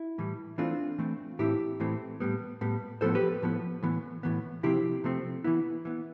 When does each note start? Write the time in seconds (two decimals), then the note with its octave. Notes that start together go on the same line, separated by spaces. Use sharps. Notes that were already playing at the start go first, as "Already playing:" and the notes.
Already playing: E4
0.18 A2 E3 G3
0.58 E3 A3 C4 D4 F4
0.98 E3 A3 C4
1.39 A2 E3 A3 C4 E4 G4
1.80 A2 E3 A3 C4
2.20 A2 G3 B3
2.61 A2 G3 B3
3.01 A2 F3 B3 A4 C5
3.15 G4 B4
3.42 A2 F3 B3
3.83 A2 E3 B3
4.23 A2 E3 B3
4.63 C3 F3 A3 C4 E4 G4
5.04 C3 F3 A3 C4
5.44 E3 B3 E4
5.85 E3 B3